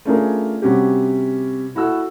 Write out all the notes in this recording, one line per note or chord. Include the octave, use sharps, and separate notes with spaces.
A3 C#4 D4 F4 G#4 A#4
C3 G3 C#4 F#4 G4
E4 F#4 A4 E6